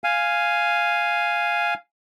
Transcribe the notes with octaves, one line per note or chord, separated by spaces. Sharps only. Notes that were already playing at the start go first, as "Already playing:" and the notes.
F5 G#5